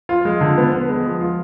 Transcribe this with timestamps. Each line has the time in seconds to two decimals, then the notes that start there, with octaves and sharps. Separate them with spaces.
0.09 F4
0.25 G#3
0.41 D3
0.57 B3
0.72 B3
0.89 G#3
1.05 F3
1.21 F4